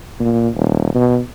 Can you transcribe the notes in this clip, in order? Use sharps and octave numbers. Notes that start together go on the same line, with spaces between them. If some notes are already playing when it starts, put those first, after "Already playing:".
A#2
D#1
B2